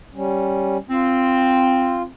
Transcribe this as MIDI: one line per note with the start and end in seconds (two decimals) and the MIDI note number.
0.14 0.77 55
0.14 0.77 61
0.90 2.11 60
0.90 2.02 65